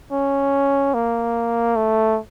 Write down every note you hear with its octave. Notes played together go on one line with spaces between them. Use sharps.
C#4
A#3
A3